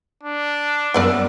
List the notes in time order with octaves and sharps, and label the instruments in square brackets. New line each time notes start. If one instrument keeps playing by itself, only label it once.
[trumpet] D4
[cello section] F#2 G3 [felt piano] B3 E6 [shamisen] A#4 D5 F#5